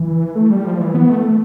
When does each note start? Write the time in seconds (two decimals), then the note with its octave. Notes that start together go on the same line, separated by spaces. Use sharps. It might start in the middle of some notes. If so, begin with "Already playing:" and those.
Already playing: E3
0.35 A3
0.50 G3
0.65 F3
0.80 E3
0.94 B3
1.09 A3
1.23 A3